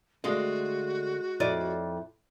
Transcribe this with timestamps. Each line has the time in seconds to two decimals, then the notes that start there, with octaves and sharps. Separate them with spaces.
0.24 D3 G#3 A3 D4 F4 F#4
1.40 F2 E4 D5 D#5